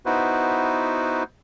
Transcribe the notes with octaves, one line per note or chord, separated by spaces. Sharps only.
B3 D#4 E4 F#4 B4 C5